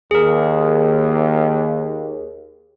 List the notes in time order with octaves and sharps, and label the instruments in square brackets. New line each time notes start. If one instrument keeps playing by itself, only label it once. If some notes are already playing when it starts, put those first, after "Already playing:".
[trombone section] D#2 [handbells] G#4 A#4